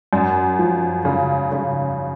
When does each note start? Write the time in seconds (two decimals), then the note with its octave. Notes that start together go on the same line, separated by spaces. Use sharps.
0.13 F#2
0.59 F3
1.05 C#3
1.52 C#3